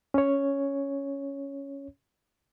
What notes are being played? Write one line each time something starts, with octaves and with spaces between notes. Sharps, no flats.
C#4 C#5